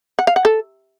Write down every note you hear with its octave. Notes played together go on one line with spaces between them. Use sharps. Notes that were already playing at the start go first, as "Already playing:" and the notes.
F#5
F5
F#5
A4